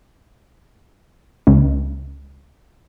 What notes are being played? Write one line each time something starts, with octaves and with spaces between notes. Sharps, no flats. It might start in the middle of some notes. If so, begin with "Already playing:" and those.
C#2